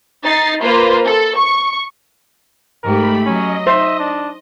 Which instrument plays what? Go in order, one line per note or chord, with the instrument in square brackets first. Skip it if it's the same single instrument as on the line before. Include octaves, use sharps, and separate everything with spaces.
[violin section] D#4 A6 C7
A#3 F4 B4 C5
A4
C#6
[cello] G#2 G4 [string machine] A3 B5 [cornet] A#4
[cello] F#3 [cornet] C#4 [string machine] D#5
[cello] D#4 [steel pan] C5 [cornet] E5
[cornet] D4